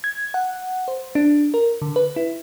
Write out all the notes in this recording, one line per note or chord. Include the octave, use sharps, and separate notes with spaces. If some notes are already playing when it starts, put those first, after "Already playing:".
G#6
F#5
C5
D4
A#4
D3
B4
E4